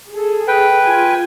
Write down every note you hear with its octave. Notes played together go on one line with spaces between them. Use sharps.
G#4 A4
B4 G5
F4 G#5